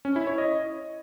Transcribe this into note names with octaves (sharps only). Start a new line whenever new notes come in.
C#4
E4
C#5
D#5